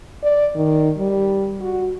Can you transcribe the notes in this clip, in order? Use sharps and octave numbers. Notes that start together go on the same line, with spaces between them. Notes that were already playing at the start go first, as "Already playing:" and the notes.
D5
D#3
G3
F#4